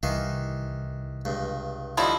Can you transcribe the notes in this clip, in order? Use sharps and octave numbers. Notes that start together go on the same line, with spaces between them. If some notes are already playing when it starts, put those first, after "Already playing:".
C2 D#3 E3 F5
C#2 G2
D3 F3 G3 D#4 E4